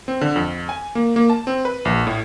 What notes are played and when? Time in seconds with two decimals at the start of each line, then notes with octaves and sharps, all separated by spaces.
0.08 C4
0.21 D3
0.36 F2
0.69 G#5
0.95 A#3
1.16 A#3
1.30 A5
1.47 C4
1.65 B4
1.85 A#1
2.07 A2